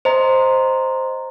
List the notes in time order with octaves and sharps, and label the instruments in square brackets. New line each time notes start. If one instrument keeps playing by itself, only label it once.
[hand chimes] C5 D#5 A#5